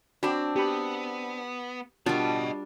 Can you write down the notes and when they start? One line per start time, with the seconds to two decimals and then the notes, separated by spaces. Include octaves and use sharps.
0.23 C4 D4 F#4 G5 B5
0.56 B3 G4 B5
2.06 B2 G3 D4 F4 A#4 D#5 A5